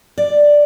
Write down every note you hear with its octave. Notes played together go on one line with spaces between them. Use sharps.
D5